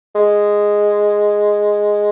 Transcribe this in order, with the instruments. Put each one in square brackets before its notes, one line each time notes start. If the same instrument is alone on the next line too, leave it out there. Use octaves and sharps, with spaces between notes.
[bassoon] G#3